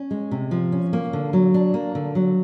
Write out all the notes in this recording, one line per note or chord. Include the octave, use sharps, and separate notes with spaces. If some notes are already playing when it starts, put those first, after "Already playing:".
Already playing: C#4
G#3
C3
F3
C#4
A#3
D3
F#3
D4
A#3
D3
F#3